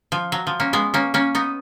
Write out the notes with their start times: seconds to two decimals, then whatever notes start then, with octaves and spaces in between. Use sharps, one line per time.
0.12 F3
0.32 F#3
0.47 F3
0.60 A#3 C#4
0.73 G#3 B3
0.94 A#3 C#4
1.14 A#3 C#4
1.35 B3 D#4